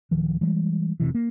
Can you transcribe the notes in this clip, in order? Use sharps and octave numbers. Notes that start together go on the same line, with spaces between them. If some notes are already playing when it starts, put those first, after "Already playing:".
D1 D#3 F3
E3 G3 G#3
F1 C3 E3
A#3